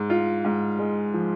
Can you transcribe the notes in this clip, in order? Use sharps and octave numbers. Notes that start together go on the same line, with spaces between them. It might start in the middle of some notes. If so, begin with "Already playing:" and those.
Already playing: G#2
F4
G#2
G#3
F3